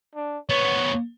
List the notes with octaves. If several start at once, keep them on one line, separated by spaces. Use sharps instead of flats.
D4
B3 C#4 C#5